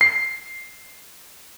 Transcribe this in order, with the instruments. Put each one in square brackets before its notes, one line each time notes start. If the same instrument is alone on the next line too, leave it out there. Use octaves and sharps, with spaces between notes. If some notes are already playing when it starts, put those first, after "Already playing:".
[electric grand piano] C7